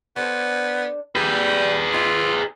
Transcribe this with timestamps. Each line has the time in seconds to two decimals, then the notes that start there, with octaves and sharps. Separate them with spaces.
0.16 B3 D4 A4 C5
1.15 G3 D4 G#4 B4
1.93 C4 D#4 F4